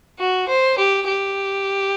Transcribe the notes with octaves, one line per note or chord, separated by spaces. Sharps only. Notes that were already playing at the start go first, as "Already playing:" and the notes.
F#4
C5
G4
G4